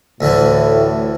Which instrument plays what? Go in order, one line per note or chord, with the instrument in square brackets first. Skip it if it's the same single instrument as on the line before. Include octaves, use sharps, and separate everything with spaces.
[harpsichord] D2 D3 E3 [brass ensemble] A2